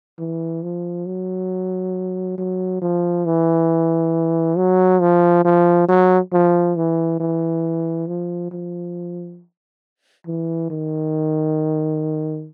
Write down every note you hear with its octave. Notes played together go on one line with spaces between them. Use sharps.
E3
F3
F#3
F#3
F3
E3
F#3
F3
F3
F#3
F3
E3
E3
F3
F3
E3
D#3